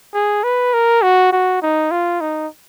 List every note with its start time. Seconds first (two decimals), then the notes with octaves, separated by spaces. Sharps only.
0.14 G#4
0.44 B4
0.74 A#4
1.02 F#4
1.32 F#4
1.62 D#4
1.91 F4
2.21 D#4